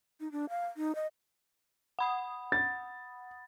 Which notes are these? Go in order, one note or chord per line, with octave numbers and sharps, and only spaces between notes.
D#4
D4
F5
D#4
D#5
F#5 B5 D#6
A6